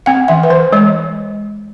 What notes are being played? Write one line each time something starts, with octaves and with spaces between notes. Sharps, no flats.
C4 F#5
E3 E5
B4
E3 C5
G#3 C#5